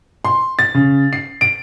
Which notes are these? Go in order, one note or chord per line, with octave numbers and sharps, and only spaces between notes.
C6
A6
C#3
C7
D7